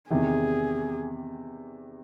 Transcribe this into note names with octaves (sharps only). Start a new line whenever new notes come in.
E2 C3 D#3 G#4